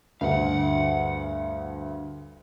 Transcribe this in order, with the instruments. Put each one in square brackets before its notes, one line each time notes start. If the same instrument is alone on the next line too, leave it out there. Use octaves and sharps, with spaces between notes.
[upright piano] D2 G2 [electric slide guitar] F5 F#5